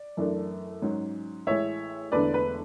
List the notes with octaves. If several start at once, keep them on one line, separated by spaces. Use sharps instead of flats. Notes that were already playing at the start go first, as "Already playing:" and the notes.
Already playing: D5
F#2 E3 A3 D4
G#2 F#3 C#4
A1 A2 G#3 C#5 E5
E1 E2 D3 A3 D4 B4 D5
B4